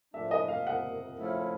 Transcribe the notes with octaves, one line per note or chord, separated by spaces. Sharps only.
A2 F3 A3 D4 E5
D#5
F5
F#5
F3 A3 C#4 E4